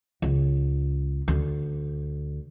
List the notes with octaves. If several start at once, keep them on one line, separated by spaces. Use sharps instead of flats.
C#2
D2